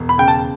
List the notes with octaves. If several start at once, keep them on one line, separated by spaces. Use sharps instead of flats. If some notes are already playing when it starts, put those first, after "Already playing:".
Already playing: E1
B5
C#3 G5
A5